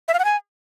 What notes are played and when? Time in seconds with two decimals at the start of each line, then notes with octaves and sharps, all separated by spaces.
0.08 E5
0.14 F5
0.19 F#5
0.25 G#5